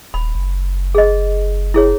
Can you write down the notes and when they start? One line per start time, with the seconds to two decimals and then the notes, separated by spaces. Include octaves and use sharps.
0.14 D#1 B5
0.35 F#1
0.95 G#4 D#5
1.74 E4 G#4 C#5